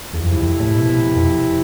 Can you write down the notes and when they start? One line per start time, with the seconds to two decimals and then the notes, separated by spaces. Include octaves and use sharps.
0.13 E2
0.24 F2 C3 F3 C4 E4
0.37 E2
0.41 F2
0.59 A2
0.76 B2
0.89 B2
1.03 B2
1.16 F2